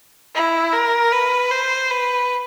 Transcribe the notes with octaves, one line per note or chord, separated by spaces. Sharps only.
E4
A#4
B4
C5
B4